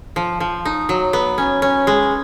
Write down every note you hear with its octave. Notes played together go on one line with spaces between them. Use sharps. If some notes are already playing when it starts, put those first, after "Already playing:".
F3
F3
D#4
F#3
B3
C#4
C#4
G#3